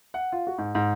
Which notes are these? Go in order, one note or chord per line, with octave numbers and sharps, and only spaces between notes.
F#5
F4
F#4
G#2
G#2